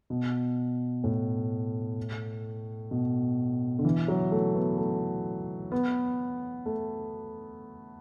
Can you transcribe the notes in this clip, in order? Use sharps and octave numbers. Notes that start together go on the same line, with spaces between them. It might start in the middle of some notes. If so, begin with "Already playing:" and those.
B2
A2
B2
D3
E3
F#3
A3
B3
A3
B3
A3